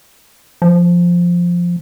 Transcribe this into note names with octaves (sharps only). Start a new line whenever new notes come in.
F3